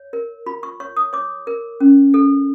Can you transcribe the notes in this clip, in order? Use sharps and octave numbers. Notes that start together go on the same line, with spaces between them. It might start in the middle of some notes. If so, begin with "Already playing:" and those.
Already playing: C#5
A#4
F4 B5
C#6
C#5 C#6
D#6
C#5 D6
A#4
C#4
A4